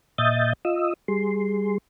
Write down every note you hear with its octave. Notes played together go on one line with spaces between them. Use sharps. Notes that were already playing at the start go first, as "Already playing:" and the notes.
A#2 D#5 E5 D#6 G6 A6
F4 D#5 D#6 E6
G3 G#4 C6